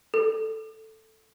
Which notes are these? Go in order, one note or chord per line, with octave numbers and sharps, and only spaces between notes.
A4